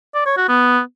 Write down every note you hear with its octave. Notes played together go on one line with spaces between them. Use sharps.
D5
C#5
F#4
B3